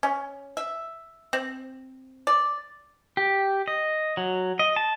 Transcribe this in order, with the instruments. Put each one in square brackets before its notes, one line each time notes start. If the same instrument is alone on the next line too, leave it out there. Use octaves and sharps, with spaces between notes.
[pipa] C#4
E5
C4
D5
[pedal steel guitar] G4
D#5
F#3
D#5
A5